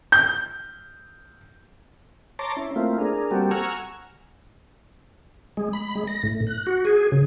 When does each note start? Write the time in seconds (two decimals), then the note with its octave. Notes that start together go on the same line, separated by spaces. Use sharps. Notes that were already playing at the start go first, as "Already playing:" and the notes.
0.12 G6
2.39 C#5 A5 A#5 C6 D6
2.57 C#4 E4
2.76 A3 A#3 C4 E4 F4
2.98 D4 G#4 A#4
3.31 G3 A#3 C4 F#4 G4 A4
3.51 F#5 G#5 A#5 C#6 E6 F6
5.57 G#3
5.73 B5
5.95 G#3
6.07 A#6
6.23 A2
6.47 F#6
6.67 F#4
6.85 G#4
7.12 C#3